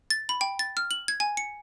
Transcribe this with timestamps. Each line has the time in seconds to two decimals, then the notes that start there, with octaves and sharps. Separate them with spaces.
0.10 A6
0.29 B5
0.41 G5
0.59 A6
0.77 F6
0.91 F#7
1.08 G#6
1.20 G#5
1.37 C#7